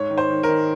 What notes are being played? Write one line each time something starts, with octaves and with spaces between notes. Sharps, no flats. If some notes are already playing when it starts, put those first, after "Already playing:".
Already playing: G#2 C#5
D#3
C5
D#3
A#4
D#3